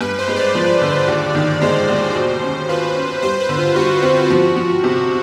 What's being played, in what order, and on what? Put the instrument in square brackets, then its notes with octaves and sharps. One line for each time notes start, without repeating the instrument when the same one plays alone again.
[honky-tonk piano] G2 [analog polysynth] B4
[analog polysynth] C5
[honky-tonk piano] G#3
[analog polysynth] D5
[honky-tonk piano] F3
D3
D#2
D#3
[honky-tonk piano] G#3 [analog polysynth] C5
[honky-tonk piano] D#2
B2
C#4
[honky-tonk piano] F4 [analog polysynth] B4
[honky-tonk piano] C#4
[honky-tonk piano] G3 [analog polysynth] C5
[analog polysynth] B4
[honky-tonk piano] D3
[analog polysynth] F4
[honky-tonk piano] G3 [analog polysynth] F#4
[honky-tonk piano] C4
[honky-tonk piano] F3 [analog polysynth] F#4
[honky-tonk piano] F3
C3